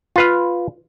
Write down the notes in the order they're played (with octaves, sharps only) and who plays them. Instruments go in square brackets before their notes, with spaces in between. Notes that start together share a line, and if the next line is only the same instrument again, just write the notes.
[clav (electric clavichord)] F4 B4 F5